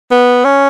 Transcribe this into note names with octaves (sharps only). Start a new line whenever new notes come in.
B3
C#4